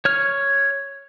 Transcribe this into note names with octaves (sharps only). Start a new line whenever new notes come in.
C#5 F6